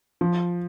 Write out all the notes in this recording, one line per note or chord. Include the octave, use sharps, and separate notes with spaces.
F3